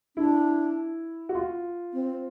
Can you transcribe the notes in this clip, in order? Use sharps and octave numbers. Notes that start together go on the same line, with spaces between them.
D4 E4
F#4
F4
C4